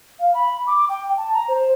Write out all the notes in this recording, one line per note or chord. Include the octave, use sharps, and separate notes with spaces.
F5
B5
D6
G5
A5
A#5
C5